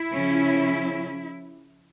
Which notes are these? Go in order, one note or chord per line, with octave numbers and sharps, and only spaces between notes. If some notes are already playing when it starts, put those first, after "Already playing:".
Already playing: E4
C#3 F3 C#4